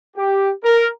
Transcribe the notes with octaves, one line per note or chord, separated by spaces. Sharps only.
G4
A#4